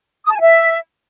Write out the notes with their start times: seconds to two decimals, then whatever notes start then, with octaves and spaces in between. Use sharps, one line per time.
0.25 D#6
0.30 A5
0.35 G#5
0.40 E5